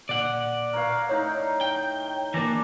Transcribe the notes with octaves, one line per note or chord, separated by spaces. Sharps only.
A#2 D5 F#5
A#4 C#5 F5
A2 D#4 C#5
G5
E3 A#3 D4 D5 A#6